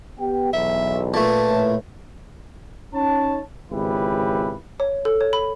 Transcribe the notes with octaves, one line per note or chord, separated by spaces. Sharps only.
B3 G4 G5
B1 E2 E5
A#2 A3 F4 B4 A5
A2
C#4 D#4 C#5 A5
G#1 C#2 C#3 E4 G4 B4
C#5
A4
C#5
B5